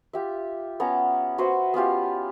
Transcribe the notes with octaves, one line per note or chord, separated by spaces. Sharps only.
F4 G4 E5
B3 C#4 C#5 A#5
F#4 B4 C5 E5
B3 C#4 F4 G4